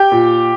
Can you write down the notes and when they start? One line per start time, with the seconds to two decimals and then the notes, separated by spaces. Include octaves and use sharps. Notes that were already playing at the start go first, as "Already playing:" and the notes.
Already playing: G4 G5
0.12 A#2